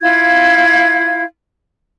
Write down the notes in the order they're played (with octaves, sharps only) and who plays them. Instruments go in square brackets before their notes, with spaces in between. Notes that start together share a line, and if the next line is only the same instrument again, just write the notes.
[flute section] E4 F4 F5 G#6